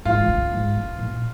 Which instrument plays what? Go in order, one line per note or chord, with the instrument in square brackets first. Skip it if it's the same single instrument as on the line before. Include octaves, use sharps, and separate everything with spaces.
[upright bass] G#2 [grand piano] F4
[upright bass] D#3
C#3
G#2
C#3
A#2